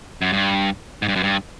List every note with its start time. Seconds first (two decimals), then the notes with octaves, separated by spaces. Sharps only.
0.22 F#2
0.33 G2
1.02 G#2
1.09 G2
1.16 F#2
1.23 G2